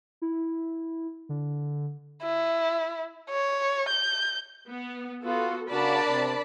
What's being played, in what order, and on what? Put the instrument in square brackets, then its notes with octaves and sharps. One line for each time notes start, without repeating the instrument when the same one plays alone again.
[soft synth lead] E4
D3
[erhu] E4
C#5
G6
[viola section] B3
[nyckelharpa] B3 [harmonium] F4 [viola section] F#4 A4
[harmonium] C#3 F#4 [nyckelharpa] D4 A#4 [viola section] D5 A5 B5
[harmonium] C3